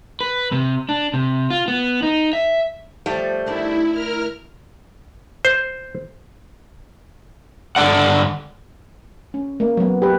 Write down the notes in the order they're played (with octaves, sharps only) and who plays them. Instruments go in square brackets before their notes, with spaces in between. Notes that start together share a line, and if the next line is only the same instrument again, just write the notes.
[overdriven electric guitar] B4
C3
D4
C3
F4
B3
D#4
E5
[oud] F3 [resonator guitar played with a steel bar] G3 A3
[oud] D2 D#3 D4 [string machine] E4
[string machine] A#4 F6
[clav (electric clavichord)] C5
[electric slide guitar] G2 D3 D5 F#5
[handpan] C#4
A#3
F#3 B3
G4 B4